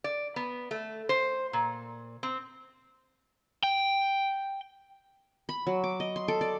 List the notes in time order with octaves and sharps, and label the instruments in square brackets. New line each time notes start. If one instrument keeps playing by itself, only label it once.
[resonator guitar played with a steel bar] D5
B3
A3
C5
A#2
C4
[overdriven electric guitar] G5
[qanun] B5
F#3
D6
D#5
C6
A4
D5